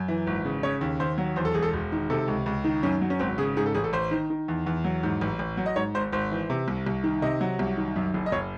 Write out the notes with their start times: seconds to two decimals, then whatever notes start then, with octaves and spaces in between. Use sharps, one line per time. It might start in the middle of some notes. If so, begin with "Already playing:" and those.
Already playing: F#2
0.08 E3
0.27 G#1
0.45 C#3
0.63 C#3 C#5
0.81 D#2
1.00 D#2 C5
1.18 F#3
1.36 E2 C5
1.45 A4
1.54 E1 G#4
1.63 A4
1.73 E1
1.92 D#3
2.10 C3 A4
2.28 C#2
2.46 C#2
2.64 D#3
2.83 F#2 C#4
3.02 F#3
3.10 C#4
3.19 G#1 C4
3.38 C#3 G#4
3.57 G#2 G#4
3.66 A4
3.74 A1 G#4
3.84 A4
3.93 A1 C5
4.11 D#3
4.30 D#3
4.48 E2
4.66 E2
4.84 F#3
5.03 G#2
5.21 A1
5.39 A1
5.57 F#3
5.66 D#5
5.76 G#2 C#5
5.94 G#1 C5
6.12 G#1 C5
6.31 E3
6.50 C3
6.68 C2
6.86 C2
7.04 D#3
7.22 C3 D#5
7.41 F#3
7.59 C2
7.77 D#3
7.96 F#2
8.14 F#1
8.26 D#5
8.32 F#1 C#5